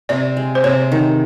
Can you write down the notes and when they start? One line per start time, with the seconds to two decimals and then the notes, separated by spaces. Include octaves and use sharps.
0.09 C3 D5
0.37 G#3
0.55 C5
0.64 C3 C#5
0.92 D#3